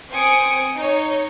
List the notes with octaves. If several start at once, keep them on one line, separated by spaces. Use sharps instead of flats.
C4 G#5 D#6 C#7 D7
D#4 C#5